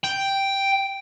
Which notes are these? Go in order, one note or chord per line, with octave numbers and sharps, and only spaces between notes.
G5